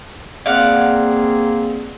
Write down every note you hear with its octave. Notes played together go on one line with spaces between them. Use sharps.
A#3 C4 G#4 D5 F5 F#5